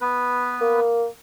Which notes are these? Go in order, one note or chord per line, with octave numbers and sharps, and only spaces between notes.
B3 B4
A#3